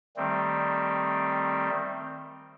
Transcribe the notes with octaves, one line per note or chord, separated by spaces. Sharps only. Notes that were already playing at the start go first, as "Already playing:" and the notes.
D#3 G3 A3 C4